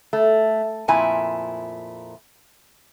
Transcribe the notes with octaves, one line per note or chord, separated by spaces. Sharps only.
A3
F2 A#2 E4 G#5